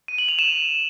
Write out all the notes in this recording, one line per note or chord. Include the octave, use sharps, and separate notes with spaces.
D#7
F#7
F7
E7